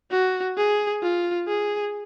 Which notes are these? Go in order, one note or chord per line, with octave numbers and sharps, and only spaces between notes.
F#4
G#4
F4
G#4